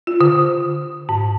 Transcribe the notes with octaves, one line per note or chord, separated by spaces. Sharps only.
F4
D3
G#2